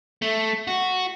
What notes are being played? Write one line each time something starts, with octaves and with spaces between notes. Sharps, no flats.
A3
F#4